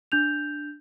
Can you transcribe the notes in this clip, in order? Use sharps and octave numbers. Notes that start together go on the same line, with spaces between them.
D4 G6 F7